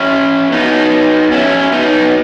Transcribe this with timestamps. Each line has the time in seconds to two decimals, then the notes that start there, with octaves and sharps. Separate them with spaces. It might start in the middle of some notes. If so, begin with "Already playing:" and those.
Already playing: C#4 E4
0.52 B3 D#4
1.32 C#4 E4
1.72 B3 D#4